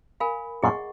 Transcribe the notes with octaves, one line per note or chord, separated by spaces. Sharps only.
A#4 F5 G#5 B5
F#2 A#2 G#4 D#5 F#5 C#6